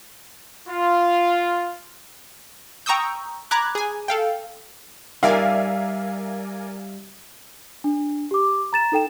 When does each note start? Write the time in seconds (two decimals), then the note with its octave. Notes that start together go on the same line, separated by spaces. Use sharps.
0.68 F4
2.86 G5 A#5 C#6 D#6 E6 G6
3.51 A#5 B5 D6 F#6 G#6
3.75 G#4 G#5
4.08 A4 F5 G5
5.23 G3 D#4 A#4 D5 E5 F5 G#5
7.84 D4
8.31 G4 D6
8.73 A#5 A6 E7
8.92 D#4 A4 G5 E7